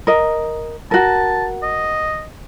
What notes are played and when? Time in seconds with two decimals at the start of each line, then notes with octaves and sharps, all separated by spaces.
0.07 A#4 D#5
0.91 F#4 A#4 A5
1.63 D#5